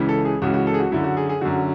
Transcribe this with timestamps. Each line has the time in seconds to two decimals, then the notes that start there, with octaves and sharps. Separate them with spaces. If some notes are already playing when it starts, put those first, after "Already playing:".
Already playing: C#2 C#3 E3
0.09 A4
0.25 G#4
0.42 C#2 C#3 E3 F#4
0.54 F#4
0.67 A4
0.74 G#4
0.80 F#4
0.92 F#2 D3 E4
1.04 F#4
1.17 G#4
1.29 G#4
1.41 F#2 D3 F#4